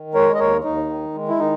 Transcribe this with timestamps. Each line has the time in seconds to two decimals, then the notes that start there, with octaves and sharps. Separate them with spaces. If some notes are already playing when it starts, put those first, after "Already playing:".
Already playing: D#3
0.14 G#3 A#4 C#5
0.35 D#5
0.39 D#2 A#4 C#5
0.64 D#2 D#4
0.89 D#3
1.15 G#3
1.28 E4
1.39 D#3 D#4